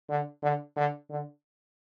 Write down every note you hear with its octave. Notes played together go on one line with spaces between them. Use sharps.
D3
D3
D3
D3